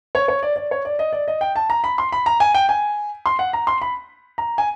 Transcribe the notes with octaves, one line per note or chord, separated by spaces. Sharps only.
C#5
C#5
D5
D5
C#5
D5
D#5
D5
D#5
G5
A5
A#5
B5
C6
B5
A#5
G#5
G5
G#5
C6
F#5
A#5
C6
B5
A#5
G#5